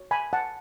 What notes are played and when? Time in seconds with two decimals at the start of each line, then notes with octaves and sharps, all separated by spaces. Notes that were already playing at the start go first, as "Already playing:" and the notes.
Already playing: F#4 C#5
0.11 G#5 B5
0.33 F#5 A5